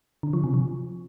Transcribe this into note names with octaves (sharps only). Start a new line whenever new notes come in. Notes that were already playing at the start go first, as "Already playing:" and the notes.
D3
F3
C3
F3